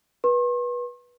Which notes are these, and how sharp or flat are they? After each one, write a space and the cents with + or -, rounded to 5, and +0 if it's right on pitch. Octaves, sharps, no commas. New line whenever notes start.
B4 -25 C6 +45